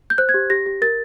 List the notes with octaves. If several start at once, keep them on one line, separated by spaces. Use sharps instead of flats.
G6
C5 F#6
G#6
G4
G4 A#6
G4
A#4 A6